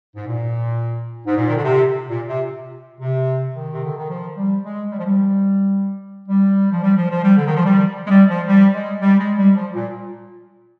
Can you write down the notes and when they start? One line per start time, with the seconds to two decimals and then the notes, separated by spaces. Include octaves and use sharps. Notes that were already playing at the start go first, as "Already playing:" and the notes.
0.16 G#2
0.27 A#2
1.27 G#2
1.37 A#2
1.49 D#3
1.56 D3
1.64 C3
2.10 A#2
2.28 C3
3.01 C3
3.55 D#3
3.73 C3
3.85 D3
3.98 D#3
4.10 F3
4.37 G3
4.65 G#3
4.92 G3
4.99 F3
5.06 G3
6.29 G3
6.72 F3
6.83 G3
6.97 F3
7.11 F3
7.24 G3
7.37 D3
7.47 D#3
7.56 F3
7.66 G3
8.07 G#3
8.10 G3
8.29 F3
8.47 G3
8.74 G#3
9.01 G3
9.19 G#3
9.38 G3
9.56 F3
9.74 A#2